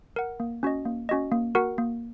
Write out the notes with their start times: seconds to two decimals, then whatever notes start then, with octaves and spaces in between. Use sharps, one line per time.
0.16 A#4 F#5
0.40 A#3
0.63 C#4 F#4 D#5
0.85 A#3
1.09 C#4 F#4 D#5
1.32 A#3
1.55 F#4 A#4 F#5
1.78 A#3